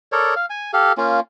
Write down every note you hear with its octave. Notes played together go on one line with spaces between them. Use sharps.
A4 A#4 C#5 D5
F5
G#5
G4 A4 F5
A#3 C#4 F4